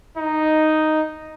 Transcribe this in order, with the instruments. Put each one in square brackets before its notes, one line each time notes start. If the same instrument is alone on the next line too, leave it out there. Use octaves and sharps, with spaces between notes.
[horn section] D#4